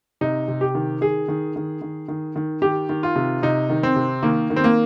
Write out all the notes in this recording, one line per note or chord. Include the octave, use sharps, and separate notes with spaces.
C3 D#4
C3
G4
D#3
D#3 G#4
D#3
D#3
D#3
D#3
D#3
D#3 G4
D#3
F4
C3
C3 D#4
D#3
C4
C3
D#3 A#3
D#3
C4
A#3